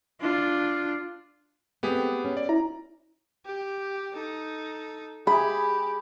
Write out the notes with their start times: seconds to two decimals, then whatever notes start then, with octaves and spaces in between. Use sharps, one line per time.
0.20 D4 F4
1.83 A3 B3 C4 G4 G#4
2.24 C#4
2.37 D5
2.49 E4 A#5
3.45 G4
4.14 D#4 A4
5.27 G4 G#4 B5